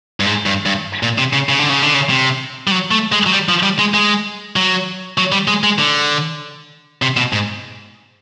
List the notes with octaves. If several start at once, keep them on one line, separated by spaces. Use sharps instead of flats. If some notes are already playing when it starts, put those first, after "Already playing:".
G2
G#2
G2
G2
A#2
C3
C#3
C#3
D3
C#3
D3
C#3
C3
G3
F#3
A3
G#3
F#3
G3
F3
G3
G#3
G#3
F#3
F#3
G3
G#3
G#3
D3
C3
B2
G#2